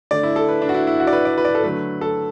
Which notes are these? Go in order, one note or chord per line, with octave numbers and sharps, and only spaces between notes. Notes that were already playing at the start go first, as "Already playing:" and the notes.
D3 A3 D5
E4
A4
B4
D4
F#4
E4
E4
F#4
D5
B4
D5
B4
D5
A4
D3 F#3 A3 B4
A4